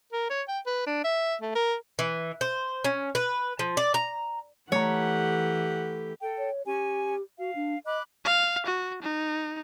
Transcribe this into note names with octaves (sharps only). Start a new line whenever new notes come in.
A#4
C#5
G5
B4
D4
E5
A3
A#4
E3
C5
C#4
B4
F3
D5
A#5
E3 A3 G4 C#5 F#5 A#5
A4 G5
C#5
C#4 G4 G#5
F#4 F5
D4
D#5 B5 D6 F#6
F5
F#4
D#4